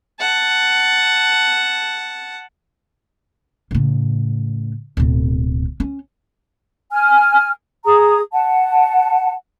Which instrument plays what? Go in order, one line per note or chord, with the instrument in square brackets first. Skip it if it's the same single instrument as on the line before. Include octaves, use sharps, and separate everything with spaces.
[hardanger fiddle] F#5 A5
[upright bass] A2 C#3
D1 B2
C#4
[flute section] G#5 F6
G#4 A#5 D#6
F#5 A5